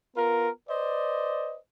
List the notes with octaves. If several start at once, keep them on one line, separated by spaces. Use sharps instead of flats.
B3 F4 A#4
B4 C5 D5 D#5